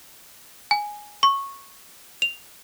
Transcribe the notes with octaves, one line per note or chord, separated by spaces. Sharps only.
G#5
C#6
F7